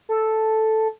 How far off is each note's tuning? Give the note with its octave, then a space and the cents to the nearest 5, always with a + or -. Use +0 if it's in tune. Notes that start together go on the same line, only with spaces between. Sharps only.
A4 +0